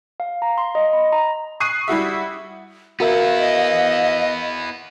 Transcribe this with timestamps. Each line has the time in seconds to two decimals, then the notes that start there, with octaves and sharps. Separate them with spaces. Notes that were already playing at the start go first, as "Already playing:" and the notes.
0.20 F5
0.42 A#5
0.58 C6
0.75 D#5
0.93 B5
1.12 A#5
1.60 C#6 D#6 F#6 C7 D#7
1.88 G3 E4 F#4 E5
3.00 B3 E4 F#4 A#4 E5 F5
3.39 D#5